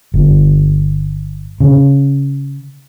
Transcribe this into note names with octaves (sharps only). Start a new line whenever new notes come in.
G1
C#3